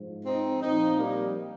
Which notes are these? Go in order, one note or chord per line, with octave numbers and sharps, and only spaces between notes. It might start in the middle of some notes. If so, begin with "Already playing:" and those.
Already playing: G#2 F3
C4 D#4
A#2 F3 C4 D#4
G3 A#3